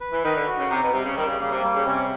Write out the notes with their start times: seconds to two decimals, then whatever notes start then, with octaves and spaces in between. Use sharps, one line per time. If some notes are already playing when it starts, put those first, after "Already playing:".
0.01 B4
0.12 E3
0.24 D#3 B4
0.36 D3
0.47 F#4
0.59 C#3
0.70 C3 D#4
0.82 B2
0.93 C3 G3
1.04 C#3
1.16 D#3 G3
1.28 C#3
1.40 C#3 A#3
1.52 C3
1.63 G3
1.75 C#3
1.86 C3 C#4